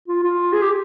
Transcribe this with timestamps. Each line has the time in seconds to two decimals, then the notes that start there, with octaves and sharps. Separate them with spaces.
0.08 F4
0.23 F4
0.53 G#4
0.62 G4